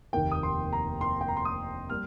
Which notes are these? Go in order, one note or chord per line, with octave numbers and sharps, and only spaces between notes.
F1 D#2 D#3 A#3 G5
D#6
C6
A#5
C6
G5
A#5
C6
D#6
G3 A#3 F6